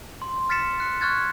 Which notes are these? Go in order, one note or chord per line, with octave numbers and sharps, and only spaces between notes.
C6
F6 A6 B6 C#7 E7
F#6 C#7
C#6 F6 F#6 G#6 A6